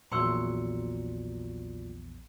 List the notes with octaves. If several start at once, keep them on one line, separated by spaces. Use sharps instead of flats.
A#1 E2 A#2 F#3 C6 C#6 E6 C#7